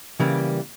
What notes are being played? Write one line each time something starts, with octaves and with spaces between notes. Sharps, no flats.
C#3 E3 G3 A#3